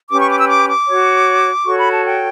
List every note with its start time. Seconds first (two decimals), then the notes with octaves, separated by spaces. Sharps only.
0.10 C#4 G4 B4 D6
0.20 C#6
0.30 D6
0.39 E6
0.49 D6
0.69 D6
0.88 F#4 C#5
1.65 F#4 A4 C#5 C#6
1.79 B5
1.92 A5
2.05 G5